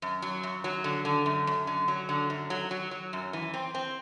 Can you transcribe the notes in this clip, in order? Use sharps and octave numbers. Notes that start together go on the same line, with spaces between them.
F#2
F#3
F#2
F#3
D3
D3
F#2
F#2
D3
F#3
D3
F#2
F#3
F#3
F#3
F#2
E3
C4
C4